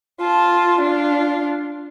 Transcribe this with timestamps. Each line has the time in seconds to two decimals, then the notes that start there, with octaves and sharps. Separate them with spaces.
0.21 F4 A5
0.82 D4 F4